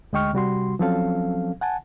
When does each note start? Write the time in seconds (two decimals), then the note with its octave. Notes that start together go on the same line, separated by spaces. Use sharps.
0.13 D2 G#3 D#5 G5 C#6 F6
0.33 C3 G3 F#4 C6
0.79 F3 F#3 C4 C#4 A4 F5
1.61 F#5 G#5 A5